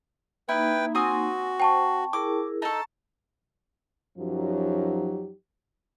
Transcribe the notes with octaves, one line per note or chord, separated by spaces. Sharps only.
A#3 D#4 E4 B4 G5
C4 F#4 G#5 D#6
C5 G5 A5 C#6
E4 G#4 A#4 D6
D#4 A4 A5 A#5 C#6
F#2 F3 F#3 D#4 G4